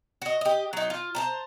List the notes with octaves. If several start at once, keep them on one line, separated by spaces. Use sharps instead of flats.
F#4 D#5
G4 D#5
F#3 D#4
F4
C5 A5 A#5